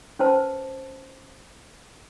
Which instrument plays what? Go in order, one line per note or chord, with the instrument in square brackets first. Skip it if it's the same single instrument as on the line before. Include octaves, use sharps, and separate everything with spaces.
[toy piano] C#4 B4 C5 A5